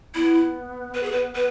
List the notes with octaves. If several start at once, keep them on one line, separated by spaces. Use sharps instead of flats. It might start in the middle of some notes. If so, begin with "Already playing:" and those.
B3 E4
B4
G#4
B4
B4